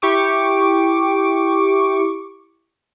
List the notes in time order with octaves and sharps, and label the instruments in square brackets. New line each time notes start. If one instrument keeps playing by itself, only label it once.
[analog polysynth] E4 G4 C#6 D6